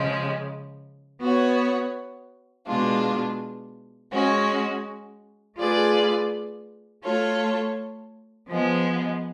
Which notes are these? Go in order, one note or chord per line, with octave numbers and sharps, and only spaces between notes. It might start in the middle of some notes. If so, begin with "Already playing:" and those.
Already playing: C#3 F3 G#3
B3 F#4 C#5
B2 G#3 D4 F4
G#3 C#4 F#4
A3 F4 G#4 B4 D5
A3 F4 A4 C#5
F3 G#3 B3